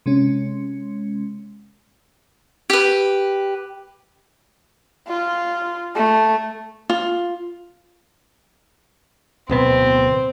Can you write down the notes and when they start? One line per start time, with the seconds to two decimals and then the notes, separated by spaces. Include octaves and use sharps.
0.06 C3 G#3 C#4
2.70 G4 B4
5.08 F4
5.95 A3
6.90 F4
9.50 D1 B2 B3 C4